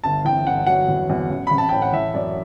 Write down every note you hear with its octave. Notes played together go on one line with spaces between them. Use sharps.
G1 A5
E3 G5
G1 F#5
F#3 F#5
E2
E2
A1
A1 B5
A5
A2 G5
F#5
E3 E5
F#2 D5